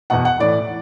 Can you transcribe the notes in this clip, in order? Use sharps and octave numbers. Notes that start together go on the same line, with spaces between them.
E2 B2 F#5
F#5
A2 E3 D5